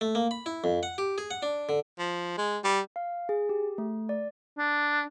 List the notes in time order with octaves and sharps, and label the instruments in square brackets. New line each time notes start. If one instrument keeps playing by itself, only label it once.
[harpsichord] A3
A#3
B5
E4
F2
F#5
G4
G#4
F#5
D4
D3
[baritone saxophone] F3
G#3
G3
[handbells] F5
G#4
G4
A3
D5
[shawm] D4